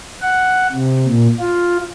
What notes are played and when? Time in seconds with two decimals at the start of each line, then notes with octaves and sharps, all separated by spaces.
0.22 F#5
0.72 C3
1.07 A#2
1.39 F4